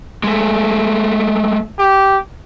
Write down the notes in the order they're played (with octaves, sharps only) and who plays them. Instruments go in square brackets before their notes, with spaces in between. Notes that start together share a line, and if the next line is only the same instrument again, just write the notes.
[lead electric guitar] G#3 A3
[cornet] G4